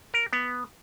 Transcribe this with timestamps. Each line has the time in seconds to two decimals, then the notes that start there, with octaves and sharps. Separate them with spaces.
0.14 A#4
0.33 B3